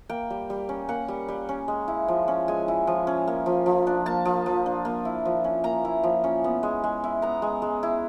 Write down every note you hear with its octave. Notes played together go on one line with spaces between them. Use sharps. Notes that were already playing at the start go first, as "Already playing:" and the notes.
A#3 G5
G3
G3
C#4
A#3 F#5
G3
G3
C#4
G#3
E4
F3
C#4
G#3 G#5
E4
F3
C#4
A#3
F3
F3
D4
A#3 A5
F3
F3
D4
A#3
E4
F3
C#4
A#3 A#5
E4
F3
C#4
B3
G#3
G#3
E4
B3 A#5
G#3
G#3
E4